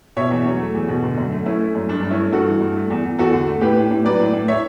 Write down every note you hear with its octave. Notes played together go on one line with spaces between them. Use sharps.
B2 C#5 E5
E2
F#3
A3
E2
B2
D3
F#2
A3
A3 C#4 E4
A3
F#2
G2 D4
D4
G2
C#4 E4
A3
G2 F#4 A4
E3
G2
A3
E2
E2
E2 F#4 A4
D3
A3
A2 G4 B4
A2
A2
F#3 B4 D5
A2
A2
C#5 E5